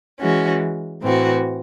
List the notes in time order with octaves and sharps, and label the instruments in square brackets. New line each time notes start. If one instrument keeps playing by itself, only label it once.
[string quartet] E3 G#3 C#4 F#4
A2 E3 C4 F#4